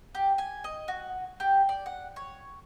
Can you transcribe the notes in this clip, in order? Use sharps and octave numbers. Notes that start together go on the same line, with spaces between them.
G4
G#5
D#5
F#4
G4
D5
F#5
C#5